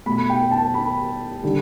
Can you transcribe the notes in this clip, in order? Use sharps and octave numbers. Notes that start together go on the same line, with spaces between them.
B2 A3 B5
G5
A5
B5
D3 G3